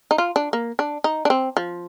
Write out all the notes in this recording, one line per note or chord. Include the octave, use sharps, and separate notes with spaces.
D#4
F4
D4
A#3
D4
D#4
D4
C4
F3